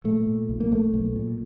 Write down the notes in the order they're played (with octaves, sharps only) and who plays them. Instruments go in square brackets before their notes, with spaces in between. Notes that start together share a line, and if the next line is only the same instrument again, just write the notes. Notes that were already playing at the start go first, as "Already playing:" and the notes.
[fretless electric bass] A#2 A3
A#2
B1
A#3
B1 A3
B1
A#2